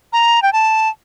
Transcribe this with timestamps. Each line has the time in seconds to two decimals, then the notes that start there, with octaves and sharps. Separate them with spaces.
0.13 A#5
0.42 G5
0.53 A5